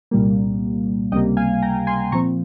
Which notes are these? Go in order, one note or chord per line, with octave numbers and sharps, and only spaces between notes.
C2 A#2 G3 A#3
C#2 C3 G3 A#3 D#5 G5
F5 G#5
G5 A#5
G#5 C6
A#2 F3 C4 A#5 C#6